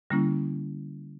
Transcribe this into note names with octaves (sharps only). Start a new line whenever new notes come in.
D3 G3 A#3 C#4 E4